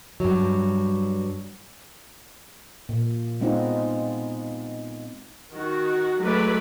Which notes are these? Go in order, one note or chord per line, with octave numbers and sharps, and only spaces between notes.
G2 F#3
A#2
G#3 B3 C4 D#4 F4
D#3 F#4
F#3 G#3 A3 B4 D5